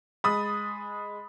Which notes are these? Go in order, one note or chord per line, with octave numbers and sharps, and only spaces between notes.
G#3 B5 D#6 A6